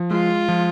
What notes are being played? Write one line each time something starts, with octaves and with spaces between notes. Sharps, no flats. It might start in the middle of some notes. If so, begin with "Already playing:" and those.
Already playing: F3
G#3 F4
F3